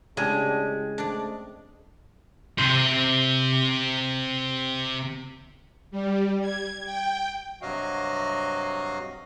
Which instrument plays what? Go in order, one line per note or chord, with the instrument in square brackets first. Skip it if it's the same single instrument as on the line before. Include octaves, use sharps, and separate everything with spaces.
[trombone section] A2 D4 G4 [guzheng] C#3 [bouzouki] G#3
[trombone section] C#3 A3 C4 [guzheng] D4 D5
[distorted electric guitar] C3 C5
[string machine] G3
G#6
G5
[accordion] G2 C3 F#3 F#4 D#5 F5